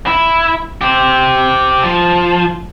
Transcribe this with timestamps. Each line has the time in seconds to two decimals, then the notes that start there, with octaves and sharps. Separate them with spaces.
0.06 E4
0.81 G4 C5
1.83 F3